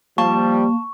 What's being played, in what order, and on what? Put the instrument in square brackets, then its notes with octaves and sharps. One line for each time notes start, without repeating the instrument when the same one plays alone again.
[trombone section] F3 G3 [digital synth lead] A#3 [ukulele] A5 [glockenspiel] C#6